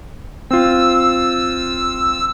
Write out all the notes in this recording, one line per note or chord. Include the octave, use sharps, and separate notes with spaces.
C4 F4 E6